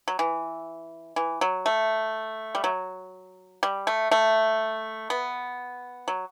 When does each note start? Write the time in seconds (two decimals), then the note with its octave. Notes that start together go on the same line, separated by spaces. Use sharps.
0.08 F#3
0.19 E3
1.16 E3
1.41 F#3
1.66 A3
2.55 G3
2.64 F#3
3.63 G3
3.87 A3
4.11 A3
5.10 B3
6.08 F#3